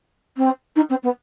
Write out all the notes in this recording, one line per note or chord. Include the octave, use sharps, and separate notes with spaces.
C4
D#4
C4
B3